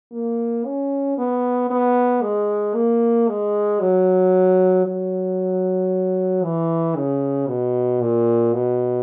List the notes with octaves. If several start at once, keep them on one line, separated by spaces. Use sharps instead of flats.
A#3
C#4
B3
B3
G#3
A#3
G#3
F#3
F#3
E3
C#3
B2
A#2
B2